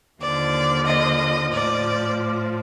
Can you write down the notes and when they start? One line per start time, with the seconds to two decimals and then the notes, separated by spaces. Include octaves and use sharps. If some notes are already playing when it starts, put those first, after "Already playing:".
0.20 D#2 D3 F3 D5
0.86 D#5
1.53 A2 F3 D5